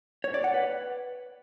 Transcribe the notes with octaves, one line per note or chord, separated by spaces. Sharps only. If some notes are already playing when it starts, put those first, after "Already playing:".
C#5
D5
F#5
B4